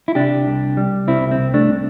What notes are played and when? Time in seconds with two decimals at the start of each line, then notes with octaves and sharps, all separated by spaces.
0.08 E4
0.15 C3 D4 G4
0.46 C2
0.77 G3
1.07 C2 C4 E4
1.31 C4
1.38 C2
1.54 A3 D4
1.69 C3